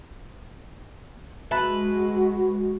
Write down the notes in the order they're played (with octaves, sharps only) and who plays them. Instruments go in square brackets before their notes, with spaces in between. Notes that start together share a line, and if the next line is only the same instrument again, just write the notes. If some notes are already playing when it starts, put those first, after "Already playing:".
[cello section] G#3 [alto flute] F#4 [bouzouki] B4 [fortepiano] E5 A5 B5